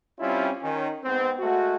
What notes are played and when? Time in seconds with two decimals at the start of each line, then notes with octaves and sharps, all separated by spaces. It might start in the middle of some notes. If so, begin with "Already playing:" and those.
0.20 G3 C4 C#4 E4 F4
0.61 D#3 C#4
1.04 G#2 B3 C4
1.40 G#3 A3 F#4